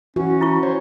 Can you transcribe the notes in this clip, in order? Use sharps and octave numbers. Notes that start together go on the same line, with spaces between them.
E3 C#4 F#4
E4 F4 C#6
C5 C#5